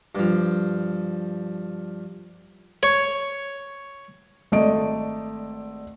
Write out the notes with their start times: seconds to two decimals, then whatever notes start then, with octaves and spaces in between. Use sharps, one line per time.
0.15 G2 F3
2.83 C#5
4.52 G#1 A3 D5 D#5 D7